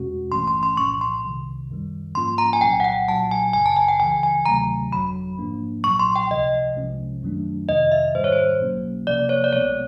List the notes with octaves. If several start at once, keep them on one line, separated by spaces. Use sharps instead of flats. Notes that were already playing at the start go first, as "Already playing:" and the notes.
Already playing: E2 B2 G#3 C#4 F#4
G1 G2 E3 A3 C#4 C6
C6
C6
C2 A#2 F3 C#6
C6
C2 C3 D#3
F#2 D#3 G3
G#2 F3 A#3 C#4 F4 C6
A#5
G#5
C2 A#2 F#3 G5
F#5
G5
B1 A#2 F#3 A5
G#5
G1 F#2 C#3 G#5
A5
G#5
G5
C#2 C#3 E3 G#5
G#5
D2 C3 D#3 F#3 A3 A#5
G1 F2 D3 F#3 B5
G#2 F3 A#3 D4
B1 A#2 F#3 C#6
C6
G5
C#2 C3 F3 D#5
C2 C3 F3 G#3 C#4
F#2 D#3 F#3 A3 D4
F2 C3 D#3 D#5
E5
G#2 D#3 G3 C5
C#5
C5
B1 B2 F#3 A#3 C#4
C3 F3 A#3 D5
C#5
D5
B1 B2 G#3 B3 C#5